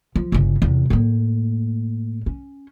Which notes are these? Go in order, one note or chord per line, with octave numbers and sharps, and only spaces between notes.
F3
G1 C#3
E2 C3
A2 A#3
C#4